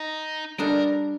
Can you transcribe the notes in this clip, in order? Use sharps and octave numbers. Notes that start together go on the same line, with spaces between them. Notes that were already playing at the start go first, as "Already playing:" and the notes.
Already playing: D#4
G3 D4 A4 A#4 D#5